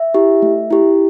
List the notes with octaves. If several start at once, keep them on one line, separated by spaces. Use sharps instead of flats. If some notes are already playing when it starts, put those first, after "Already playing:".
Already playing: E5
E4 G4
A3
E4 G4